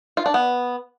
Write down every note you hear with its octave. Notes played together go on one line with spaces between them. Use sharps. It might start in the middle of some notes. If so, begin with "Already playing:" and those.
F4
D4
B3